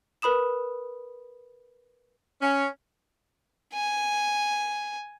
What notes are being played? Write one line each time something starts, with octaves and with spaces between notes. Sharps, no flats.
A#4 B4 B5 D#6 E7
C#4
G#5